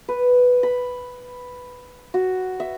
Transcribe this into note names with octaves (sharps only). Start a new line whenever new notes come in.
B4
B5
F#4
E5